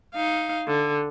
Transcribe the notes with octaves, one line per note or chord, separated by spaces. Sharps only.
D#4 F5
D3